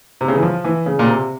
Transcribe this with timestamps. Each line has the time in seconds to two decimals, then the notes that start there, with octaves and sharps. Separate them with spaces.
0.21 C3
0.28 C#3
0.36 E3
0.43 F3
0.64 E3
0.86 C#3
0.99 A#2
1.07 C3